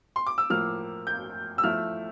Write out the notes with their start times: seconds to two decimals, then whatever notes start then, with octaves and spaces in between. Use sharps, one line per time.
0.16 C6
0.27 D6
0.38 E6
0.50 A2 F3 A#3 F6
1.07 G6
1.58 E6
1.63 F3 A3 E4 F6